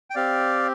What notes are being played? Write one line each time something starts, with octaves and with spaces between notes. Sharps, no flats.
G5
C4 G4 D5 F5